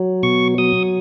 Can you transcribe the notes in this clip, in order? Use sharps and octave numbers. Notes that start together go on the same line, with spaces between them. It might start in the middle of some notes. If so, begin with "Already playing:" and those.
Already playing: F#3
B2 C#6
F#3 D#6